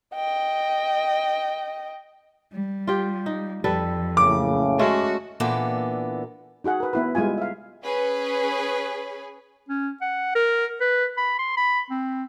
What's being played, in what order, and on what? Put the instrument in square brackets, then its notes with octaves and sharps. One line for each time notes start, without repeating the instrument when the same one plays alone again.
[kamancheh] D#5 G5
[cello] G3
[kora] F4 G4
D#4
[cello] F2 [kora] G3 A4 B4
[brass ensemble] F#1 A2 C#3 [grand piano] D6
[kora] G#3 A3 C#4 [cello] F#4
[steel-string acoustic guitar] A#2 E3 A#3 B3 D4 A4
[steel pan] D#4 F#4 G#4 F#5
A#4 B4
B3 E4 B4
G3 G#3 E4 F4 G#5
E5 F5
[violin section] C#4 G#4 B4
[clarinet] C#4
F#5
A#4
B4
B5
C6
B5
C4